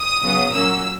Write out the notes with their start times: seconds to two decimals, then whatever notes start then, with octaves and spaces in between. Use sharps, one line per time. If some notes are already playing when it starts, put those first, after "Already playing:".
Already playing: D#6
0.22 C#3 F#3 B3
0.52 A#2 F#3 A#3 C#4 E6